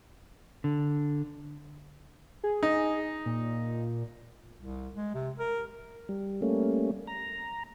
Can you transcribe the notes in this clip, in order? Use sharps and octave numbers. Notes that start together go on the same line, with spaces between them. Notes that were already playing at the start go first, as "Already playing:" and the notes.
D3
G#4
D#4
A#2
C2
G#3
C3
A#4
G3
G3 A3 A#3 C#4
A#5